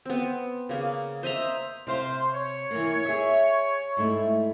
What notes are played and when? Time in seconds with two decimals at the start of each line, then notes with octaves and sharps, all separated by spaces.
0.05 B3 C4
0.69 C#3 A#3
1.23 C5 D#5 E5 A#5
1.87 C3 C5 F5
2.32 C#5
2.71 E3 A#3
3.05 G#4 E5
3.97 G#2 A3 E4